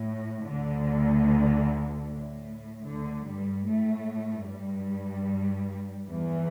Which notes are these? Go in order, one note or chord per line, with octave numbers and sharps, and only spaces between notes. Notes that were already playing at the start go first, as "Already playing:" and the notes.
Already playing: A2
D2 D3
A2
D2 D3
G2 G3
A2 A3
G2 G3
E2 E3